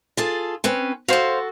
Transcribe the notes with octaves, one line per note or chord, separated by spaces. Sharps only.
F4 G#4 A4
C4 C#4 B4
F#4 A4 C5 F5